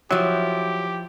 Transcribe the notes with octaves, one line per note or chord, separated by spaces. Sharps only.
F3 F#3 E4 G4